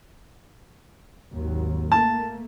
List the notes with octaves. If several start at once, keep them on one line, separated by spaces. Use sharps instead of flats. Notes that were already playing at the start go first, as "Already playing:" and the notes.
G#1 D#2 F#3
A3 A#3 A5